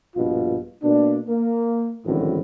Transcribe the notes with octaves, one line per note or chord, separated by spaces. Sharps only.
A#1 G2 B2 F4
B2 A#3 D4
A#3
G#1 F#2 A2 D3 E3